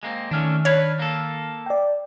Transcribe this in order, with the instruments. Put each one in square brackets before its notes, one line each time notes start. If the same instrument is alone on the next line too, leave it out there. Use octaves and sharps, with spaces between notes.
[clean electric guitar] G#3 A#3 C4
[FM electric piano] D#3 F6 [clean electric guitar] A3 C#4 D4
[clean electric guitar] D4 B4 [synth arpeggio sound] C#5
[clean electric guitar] A#3 A4
[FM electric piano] D5 G5